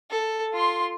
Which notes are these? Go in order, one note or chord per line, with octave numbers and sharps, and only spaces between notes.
A4
F4 C6